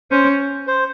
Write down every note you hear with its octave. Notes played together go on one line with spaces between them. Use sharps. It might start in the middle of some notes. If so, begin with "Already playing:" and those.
C#4 C5
C5